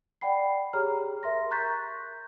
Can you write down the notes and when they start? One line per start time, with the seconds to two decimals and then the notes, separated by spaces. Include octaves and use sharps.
0.21 D5 F#5 G5 B5 C7
0.73 G4 G#4 C#5 A#5 F6
1.23 A#4 E5 C6 A#6
1.51 A#5 C#6 F#6 G6 A6 B6